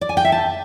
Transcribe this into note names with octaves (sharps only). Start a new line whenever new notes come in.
D5
G#5
G5
E5
A5